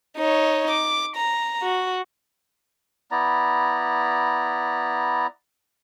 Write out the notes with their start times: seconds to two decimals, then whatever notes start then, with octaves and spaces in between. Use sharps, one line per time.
0.18 D#4 C#5
0.70 D6
1.16 A#5
1.63 F#4
3.11 B3 E4 D5 A#5